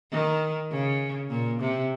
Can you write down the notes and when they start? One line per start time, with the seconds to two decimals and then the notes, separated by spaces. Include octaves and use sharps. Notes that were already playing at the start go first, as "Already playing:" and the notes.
0.11 D#3
0.71 C#3
1.30 A#2
1.60 C3